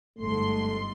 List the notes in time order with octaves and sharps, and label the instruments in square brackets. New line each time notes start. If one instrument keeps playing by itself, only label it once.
[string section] G1 G#2 C6 [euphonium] A3